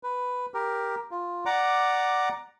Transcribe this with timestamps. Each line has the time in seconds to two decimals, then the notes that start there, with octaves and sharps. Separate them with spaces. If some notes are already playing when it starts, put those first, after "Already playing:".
0.03 B4
0.54 G4 A#4
1.11 F4
1.46 D5 F#5 A#5 D6